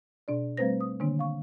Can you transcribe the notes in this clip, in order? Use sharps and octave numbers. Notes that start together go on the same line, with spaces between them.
B2 D4 D5
G3 A3 C4 B4 C5 A#6
D#6
D3 D#3 A#3 D4
F5 C#6